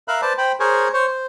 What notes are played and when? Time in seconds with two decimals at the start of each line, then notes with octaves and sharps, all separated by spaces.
0.08 A#4 E5 F5 B5 F#6
0.22 B4 C5 D5 A5
0.38 C5 G5 B5
0.60 G#4 A#4 C5 C#5 G#5
0.93 C5 C#5
1.08 C5